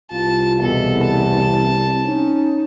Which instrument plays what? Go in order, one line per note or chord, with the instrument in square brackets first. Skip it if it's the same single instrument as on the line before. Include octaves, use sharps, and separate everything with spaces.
[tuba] C2 [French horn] F4 [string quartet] A5
[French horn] E2 [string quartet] B2 A4
[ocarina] C4 [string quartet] A5
[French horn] C#4 [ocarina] D#4